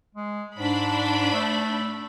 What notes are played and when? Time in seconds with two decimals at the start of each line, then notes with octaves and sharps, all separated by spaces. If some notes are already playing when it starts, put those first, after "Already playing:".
0.15 G#3
0.58 G#2 D4 B5
1.33 A3